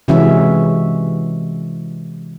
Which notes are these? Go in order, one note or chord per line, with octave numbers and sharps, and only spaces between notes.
C3 E3 G#3 C#4 F#4 E5